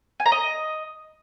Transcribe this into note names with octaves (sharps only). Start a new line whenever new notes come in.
G#5
A#5
D#5